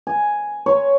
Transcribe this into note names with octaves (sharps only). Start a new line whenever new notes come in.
G#5
C#5